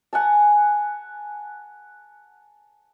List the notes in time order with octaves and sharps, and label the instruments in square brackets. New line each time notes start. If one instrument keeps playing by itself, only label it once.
[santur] F#5 G#5 A5